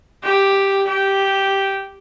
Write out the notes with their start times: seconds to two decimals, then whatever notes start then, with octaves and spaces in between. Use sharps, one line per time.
0.23 G4
0.87 G4